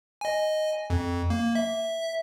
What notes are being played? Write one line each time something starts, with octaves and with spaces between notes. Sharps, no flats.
D#5 G#5
F2
A#3
E5